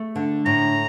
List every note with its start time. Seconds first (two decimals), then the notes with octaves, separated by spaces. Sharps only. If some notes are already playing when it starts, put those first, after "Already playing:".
Already playing: A3
0.16 D3
0.46 A2 A#5